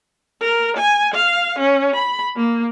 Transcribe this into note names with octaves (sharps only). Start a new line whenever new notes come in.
A#4
G#5
F5
C#4
B5
A#3